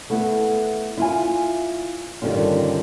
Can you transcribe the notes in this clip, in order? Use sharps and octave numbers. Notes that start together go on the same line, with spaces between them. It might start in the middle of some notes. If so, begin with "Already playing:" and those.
A3 B3 E4
E4 F4 G#5
G2 D3 D#3 G3 C#4 F4